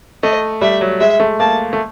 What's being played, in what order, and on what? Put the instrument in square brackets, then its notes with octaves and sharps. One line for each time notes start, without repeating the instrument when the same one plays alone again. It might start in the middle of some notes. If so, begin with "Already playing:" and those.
[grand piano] A3 [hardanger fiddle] D#5
[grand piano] G3 [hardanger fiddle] E5
[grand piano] F#3
[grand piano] G#3 [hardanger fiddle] E5
[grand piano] A3
[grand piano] A#3 [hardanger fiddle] A5
[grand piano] A3